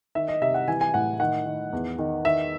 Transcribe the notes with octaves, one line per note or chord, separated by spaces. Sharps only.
D#3 E5
D#5
C3 E5
F#5
E3 G#5
G#5
A2 F#5
D#3 F#5
D#3
E2
D#3
D#3 E5